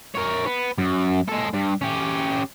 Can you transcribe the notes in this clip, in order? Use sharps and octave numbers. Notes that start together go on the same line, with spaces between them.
A#4 C#5
B3
F#2
G#3 A4
G2
C#4 G4